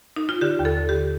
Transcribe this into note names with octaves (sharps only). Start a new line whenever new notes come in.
D#4
F4
D3 G4
D#2
A4
D3
G4